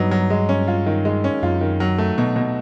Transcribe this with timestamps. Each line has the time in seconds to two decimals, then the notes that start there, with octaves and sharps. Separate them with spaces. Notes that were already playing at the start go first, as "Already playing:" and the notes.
Already playing: G2 F#3 B3 D#4
0.11 F#3
0.30 G#3
0.49 C#4
0.68 F4
0.86 D#3
1.05 G#3
1.24 C#4
1.42 F#2 F4
1.61 D#3
1.80 F#3
1.98 A3
2.18 B2
2.36 B2